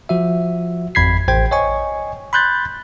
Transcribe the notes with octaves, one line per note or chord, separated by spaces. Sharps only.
F3 F#4 E5
G#1 F2 B5 G#6 B6 C7
A1 C5 G5 G#6
C#5 D#5 G#5 C#6
B5 C6 F#6 G6 A6